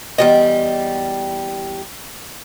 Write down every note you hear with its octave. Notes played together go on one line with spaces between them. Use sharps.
E2 G3 D#5